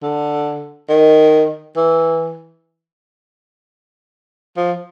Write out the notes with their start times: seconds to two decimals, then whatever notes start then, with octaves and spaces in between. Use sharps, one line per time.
0.03 D3
0.89 D#3
1.76 E3
4.57 F3